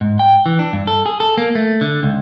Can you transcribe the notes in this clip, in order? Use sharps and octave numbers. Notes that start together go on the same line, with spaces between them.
G#2
G5
E3
D4
G2
A4
G#4
A4
A#3
A3
D3
C#2